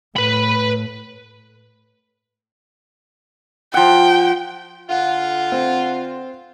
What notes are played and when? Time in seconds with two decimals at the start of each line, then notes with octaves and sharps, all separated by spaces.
0.17 A2 B4 B5
3.74 F3 F#5 G5
4.90 D3 F4 F#5
5.52 C4